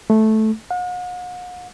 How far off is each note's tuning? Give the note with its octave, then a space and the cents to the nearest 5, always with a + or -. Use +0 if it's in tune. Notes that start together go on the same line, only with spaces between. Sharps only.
A3 -10
F#5 -45